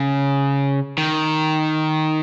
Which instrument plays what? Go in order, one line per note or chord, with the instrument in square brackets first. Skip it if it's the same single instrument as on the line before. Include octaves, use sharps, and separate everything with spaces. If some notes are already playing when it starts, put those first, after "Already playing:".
Already playing: [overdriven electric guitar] C#3
D#3